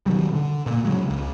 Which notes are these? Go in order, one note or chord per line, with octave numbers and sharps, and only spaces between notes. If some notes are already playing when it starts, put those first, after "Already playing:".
B2 D#3 F#3 G3
D3
A#2 A#3
C#3 F#3 G#3
C#2